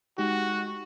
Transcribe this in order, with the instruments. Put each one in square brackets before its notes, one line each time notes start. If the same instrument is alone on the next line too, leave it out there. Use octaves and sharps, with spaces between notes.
[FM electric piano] G#3 D#4 G4 [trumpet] F#4